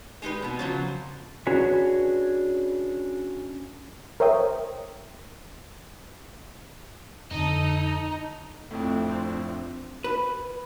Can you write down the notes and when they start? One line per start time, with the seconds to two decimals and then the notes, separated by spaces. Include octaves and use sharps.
0.22 G#3 D#4 G4 B4
0.42 B2 B3
0.59 C#3 F3 F#3
1.47 C#4 D4 F#4 G#4 B4 C#5
4.20 A#4 C5 C#5 E5 G5 D#6
7.31 F2 D3 D#4 A4 D#5
8.71 F2 A2 F3 C4 D4
10.04 B4